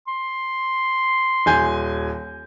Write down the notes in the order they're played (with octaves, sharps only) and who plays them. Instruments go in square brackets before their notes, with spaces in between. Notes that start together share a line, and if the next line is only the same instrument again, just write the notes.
[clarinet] C6
[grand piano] D#1 G#5 G6